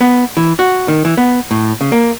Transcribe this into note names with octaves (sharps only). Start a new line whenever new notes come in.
B3
E3
F#4
D#3
E3
B3
A2
C#3
A#3